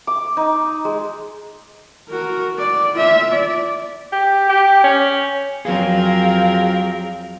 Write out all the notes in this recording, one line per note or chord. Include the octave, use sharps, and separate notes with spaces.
D6
D#4
G#3
F#4 A#4
D5
F4 E5
D5
G4
G4
C#4
F2 F#3 C4 G#4 A#4 F5